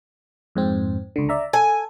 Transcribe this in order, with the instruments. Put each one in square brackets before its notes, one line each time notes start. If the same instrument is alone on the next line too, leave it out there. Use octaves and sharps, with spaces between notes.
[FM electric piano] F2 G#2 C4
C#2 D3
D5 E5 A#5
[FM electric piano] A4 [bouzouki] G#5